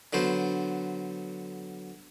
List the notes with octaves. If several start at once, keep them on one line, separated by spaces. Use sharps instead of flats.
D3 F#3 B3 C5